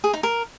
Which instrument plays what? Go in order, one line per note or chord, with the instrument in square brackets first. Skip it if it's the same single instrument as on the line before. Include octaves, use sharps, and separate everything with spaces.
[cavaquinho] G#4
D#4
A#4